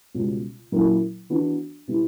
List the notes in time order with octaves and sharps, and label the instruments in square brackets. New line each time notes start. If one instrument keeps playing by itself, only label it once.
[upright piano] C#2 B2 G3
A#2 F#3 C#4 E4 A#4
E3 B3 D4 F#4
B2 G3 B3 E4